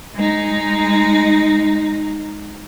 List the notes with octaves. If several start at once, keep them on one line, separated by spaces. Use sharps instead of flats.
G#3 D#4